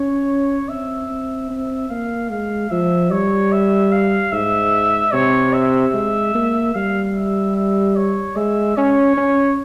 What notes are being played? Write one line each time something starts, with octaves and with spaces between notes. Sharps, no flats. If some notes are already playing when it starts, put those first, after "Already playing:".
Already playing: C#4 C#5
C4 E5
C4
C4
A#3 F5
G#3 F5
F3 E5
G3 C#5
E5
F5
G#2 E5
C3 C#5
E5
G#3
A#3
G3 F5
E5
E5
C#5
G#3 E5
C#4 C#5
C#4